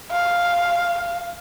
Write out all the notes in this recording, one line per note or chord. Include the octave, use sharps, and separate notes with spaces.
F5